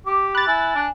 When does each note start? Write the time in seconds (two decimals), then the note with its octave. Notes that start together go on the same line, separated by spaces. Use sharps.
0.07 G4 D6
0.35 B5 F#6 A6
0.48 E4 G#5
0.76 D4